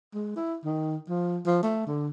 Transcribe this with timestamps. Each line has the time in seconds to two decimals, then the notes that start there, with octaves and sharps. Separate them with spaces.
0.14 G#3
0.36 E4
0.65 D#3
1.09 F3
1.46 F3
1.63 A3
1.87 D3